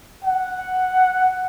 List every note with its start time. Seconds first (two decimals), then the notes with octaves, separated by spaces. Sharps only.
0.24 F#5